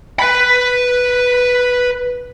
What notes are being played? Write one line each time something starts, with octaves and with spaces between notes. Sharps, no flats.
B4 B5